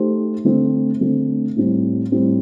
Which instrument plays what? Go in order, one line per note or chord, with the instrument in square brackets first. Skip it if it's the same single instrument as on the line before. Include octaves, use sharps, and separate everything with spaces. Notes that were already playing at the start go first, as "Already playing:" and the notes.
Already playing: [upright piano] A3 D#4 G4 C5
D3 A3 C4
D3 A3 C4
A2 G3 C4
A2 G3 C4